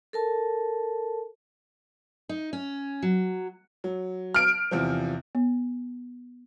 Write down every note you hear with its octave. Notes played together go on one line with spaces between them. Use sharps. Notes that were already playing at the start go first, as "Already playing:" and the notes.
A4 A#4 A5
D#4
C#4
F#3
F#3
F6 D7
E2 C3 F3
B3